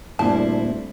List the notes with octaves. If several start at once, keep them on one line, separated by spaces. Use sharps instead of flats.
D2 A#2 G3 C4 E4 C5 A5